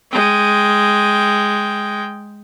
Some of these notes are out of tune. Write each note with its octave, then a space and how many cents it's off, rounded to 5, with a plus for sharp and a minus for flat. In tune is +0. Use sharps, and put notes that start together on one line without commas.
G#3 +0 G5 +0